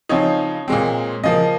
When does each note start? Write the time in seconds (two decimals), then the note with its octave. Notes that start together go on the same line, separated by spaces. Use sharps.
0.09 C#3 F3 C4 D#4 C#5
0.68 A#2 G#3 C4
1.24 C#3 F3 A#3 D#5